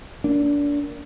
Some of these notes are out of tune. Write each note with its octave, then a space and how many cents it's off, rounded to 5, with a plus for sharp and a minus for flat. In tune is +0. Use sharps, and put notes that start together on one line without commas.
A#3 +0 D4 -25